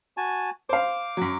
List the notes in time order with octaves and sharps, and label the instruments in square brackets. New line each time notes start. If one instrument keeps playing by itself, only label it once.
[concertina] F#4 G#5 A5
[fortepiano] C5 F5 [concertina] D6
[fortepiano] F#2 F#3